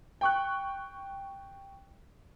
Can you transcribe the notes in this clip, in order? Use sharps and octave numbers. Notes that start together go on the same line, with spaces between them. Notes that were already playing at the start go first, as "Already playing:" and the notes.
G5 C#6 F#6